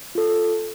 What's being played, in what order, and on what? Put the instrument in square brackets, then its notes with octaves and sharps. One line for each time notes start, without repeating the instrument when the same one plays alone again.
[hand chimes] F4 A4